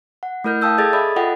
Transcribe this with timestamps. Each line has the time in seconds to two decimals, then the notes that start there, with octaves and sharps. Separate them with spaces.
0.23 F#5
0.44 A3 E4 A#4 F6 G6
0.61 F5 G5 A5 D#6 E6 G6
0.78 G#4 A4 D#5 G#6 A6
0.93 D5 E5 B5 D#6 A6
1.16 F4 A4 D#5 F#5 G5